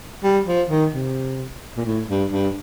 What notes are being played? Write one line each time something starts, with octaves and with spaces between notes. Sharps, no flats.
G3
F3
D#3
C3
A#2
A2
G2
G2